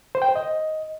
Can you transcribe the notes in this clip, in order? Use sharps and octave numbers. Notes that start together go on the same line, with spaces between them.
C5
G5
C5
D#5